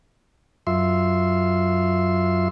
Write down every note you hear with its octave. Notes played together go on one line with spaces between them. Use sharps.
F#2 F4 E5 C6